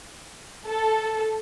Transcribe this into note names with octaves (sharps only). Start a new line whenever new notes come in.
A4